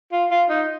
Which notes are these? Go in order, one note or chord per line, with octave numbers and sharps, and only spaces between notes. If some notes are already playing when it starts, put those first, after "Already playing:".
F4
F4
D#4